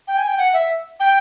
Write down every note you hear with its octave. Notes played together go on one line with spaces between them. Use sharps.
G5
G#5
G5
F#5
E5
G5